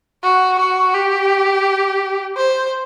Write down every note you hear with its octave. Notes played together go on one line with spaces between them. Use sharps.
F#4
F#4
G4
C5